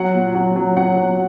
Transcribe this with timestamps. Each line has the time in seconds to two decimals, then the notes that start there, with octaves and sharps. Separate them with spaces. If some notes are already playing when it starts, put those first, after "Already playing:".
Already playing: F#3 F#5
0.14 A#2
0.35 F#3
0.56 F#3
0.76 F#3 F#5
0.97 F#3